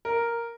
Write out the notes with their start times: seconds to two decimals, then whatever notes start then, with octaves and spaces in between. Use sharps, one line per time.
0.05 A#4